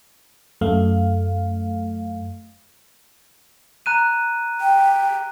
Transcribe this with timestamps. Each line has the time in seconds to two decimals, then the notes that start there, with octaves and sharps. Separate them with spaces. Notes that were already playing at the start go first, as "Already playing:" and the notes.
0.61 F#2 A3 F5
3.86 A#5 F#6 D#7
4.61 G5